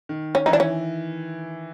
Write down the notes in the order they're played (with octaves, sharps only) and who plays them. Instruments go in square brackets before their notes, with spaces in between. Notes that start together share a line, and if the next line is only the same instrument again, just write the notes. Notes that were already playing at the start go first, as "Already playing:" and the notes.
[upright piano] D#3
[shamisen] C#4
[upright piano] E3 [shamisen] D#4
[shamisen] D4
C#4